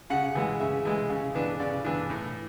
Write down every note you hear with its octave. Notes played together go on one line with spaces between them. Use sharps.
C#3 F#5
E3 G#3
C#3 E5
E3 G#3
C#3
E3 B3 D4
C#3 D5
E3 B3 D4
A2